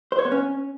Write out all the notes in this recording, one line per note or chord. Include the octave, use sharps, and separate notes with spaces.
C5
C#5
B3
C#4